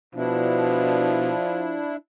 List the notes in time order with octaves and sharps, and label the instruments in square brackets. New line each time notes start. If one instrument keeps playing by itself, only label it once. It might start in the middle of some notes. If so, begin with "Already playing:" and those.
[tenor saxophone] B2 [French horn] F3 [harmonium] D4 E4